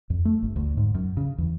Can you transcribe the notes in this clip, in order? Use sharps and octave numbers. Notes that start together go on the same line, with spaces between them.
F2
A3
G1
D2
G#2
F#2
C#3
E2